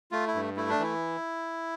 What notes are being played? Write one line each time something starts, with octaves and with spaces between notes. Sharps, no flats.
A3 F4
E4
G2
A3 E4
D4
E3 E4